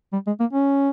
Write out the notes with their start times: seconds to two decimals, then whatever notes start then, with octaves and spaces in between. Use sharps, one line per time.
0.13 G3
0.27 G#3
0.40 A#3
0.53 C#4